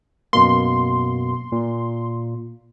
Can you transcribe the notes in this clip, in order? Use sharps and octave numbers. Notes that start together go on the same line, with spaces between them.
F#2 B2 A#3 C6
A#2